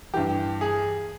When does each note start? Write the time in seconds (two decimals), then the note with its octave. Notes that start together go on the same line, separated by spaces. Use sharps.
0.14 G2 E3 G4
0.61 G#4